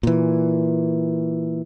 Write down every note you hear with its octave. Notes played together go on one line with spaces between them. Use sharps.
A#2 E3